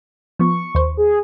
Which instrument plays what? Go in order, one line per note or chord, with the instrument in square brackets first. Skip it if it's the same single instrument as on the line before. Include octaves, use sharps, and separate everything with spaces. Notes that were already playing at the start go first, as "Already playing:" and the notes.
[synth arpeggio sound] F3 B3 [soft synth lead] C#6
[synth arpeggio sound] D#2 C5
[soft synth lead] G#4